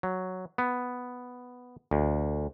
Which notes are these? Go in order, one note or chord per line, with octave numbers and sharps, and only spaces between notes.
F#3
B3
D2